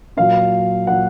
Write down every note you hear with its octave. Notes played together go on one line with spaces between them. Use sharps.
A#2 F#3 F5
A#2 F#3 F#5